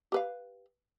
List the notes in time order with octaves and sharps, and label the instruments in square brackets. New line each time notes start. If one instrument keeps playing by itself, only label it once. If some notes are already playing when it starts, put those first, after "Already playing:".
[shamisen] G4 B4 F5